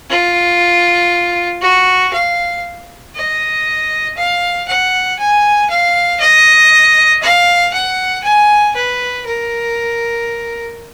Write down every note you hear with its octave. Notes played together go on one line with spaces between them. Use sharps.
F4
F#4
F5
D#5
F5
F#5
G#5
F5
D#5
F5
F#5
G#5
B4
A#4